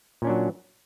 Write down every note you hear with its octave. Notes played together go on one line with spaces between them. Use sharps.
A#2 F#3 C#4 D4